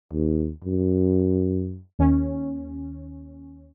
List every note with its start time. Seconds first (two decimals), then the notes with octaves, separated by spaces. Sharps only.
0.13 D#2
0.64 F#2
1.99 D#2 C#4